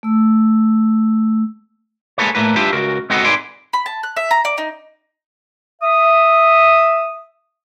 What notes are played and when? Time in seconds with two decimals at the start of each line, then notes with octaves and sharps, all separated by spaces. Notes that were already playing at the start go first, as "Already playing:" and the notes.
0.03 A3 E6
2.18 G#3 A#3 E4 A4 B4 C#5
2.35 A2 A3 A#3 B4
2.56 G3 D4 F4 G4 B4 E5
2.73 C#2 F#4 A#4
3.10 G#3 B3 C4 F#4 A4 D#5
3.24 G#2 G#4 B4 D5 C6
3.73 B5
3.86 A5
4.03 F#6
4.17 E5
4.31 A#5
4.45 D5
4.58 D#4
5.82 E5 D#6